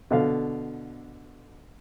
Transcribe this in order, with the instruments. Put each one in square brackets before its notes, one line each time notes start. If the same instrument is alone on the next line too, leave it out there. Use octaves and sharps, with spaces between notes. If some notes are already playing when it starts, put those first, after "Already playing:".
[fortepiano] B2 D3 F5